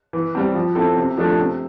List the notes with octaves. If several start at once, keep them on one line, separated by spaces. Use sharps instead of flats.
E3
G3 C4
F3
C4 E4 A4
C3
F3 A3 D4
C3